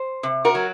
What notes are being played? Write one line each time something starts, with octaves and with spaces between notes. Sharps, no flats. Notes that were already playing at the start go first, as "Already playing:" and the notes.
Already playing: C5
C3
F#4 A#4
F#3